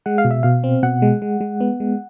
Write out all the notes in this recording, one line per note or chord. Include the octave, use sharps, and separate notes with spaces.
G#3 F#5
F5
B2
E5
B2 F5
C4
B2 F#5
G#3
G#3
G#3
B3
G#3